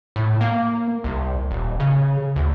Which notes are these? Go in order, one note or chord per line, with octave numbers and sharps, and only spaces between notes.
A2
A#3
C2
D#1
C#3
D2